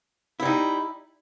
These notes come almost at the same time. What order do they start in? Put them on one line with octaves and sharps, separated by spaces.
E4 G3 D#4